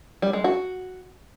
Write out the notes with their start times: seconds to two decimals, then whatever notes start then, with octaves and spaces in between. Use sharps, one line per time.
0.22 G3
0.33 G#3
0.44 F#4